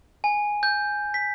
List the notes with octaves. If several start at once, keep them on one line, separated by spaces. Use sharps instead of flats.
G#5
G6
B6